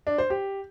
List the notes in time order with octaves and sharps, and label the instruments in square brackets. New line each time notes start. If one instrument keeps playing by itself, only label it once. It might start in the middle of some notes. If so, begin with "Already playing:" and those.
[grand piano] D4
C5
G4